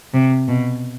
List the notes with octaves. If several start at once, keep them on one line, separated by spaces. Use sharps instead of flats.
C3
B2